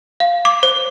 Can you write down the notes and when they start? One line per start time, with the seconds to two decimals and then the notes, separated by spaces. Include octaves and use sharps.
0.20 F5
0.45 D6
0.63 C5